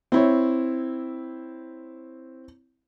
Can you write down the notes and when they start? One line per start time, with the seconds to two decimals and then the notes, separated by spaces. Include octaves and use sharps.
0.12 C4 E4 C#5